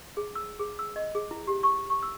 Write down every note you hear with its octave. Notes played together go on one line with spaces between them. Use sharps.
G#4
E6
G#4
E6
D#5
G#4
E4
G4
C#6
C#6
E6